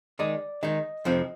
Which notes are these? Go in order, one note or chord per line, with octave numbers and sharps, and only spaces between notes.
D#3 G#3 D#4 D5
D#3 G#3 D#4 D#5
F2 C3 F3 C4